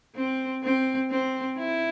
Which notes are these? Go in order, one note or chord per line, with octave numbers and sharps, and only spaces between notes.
C4
C4
C4
E4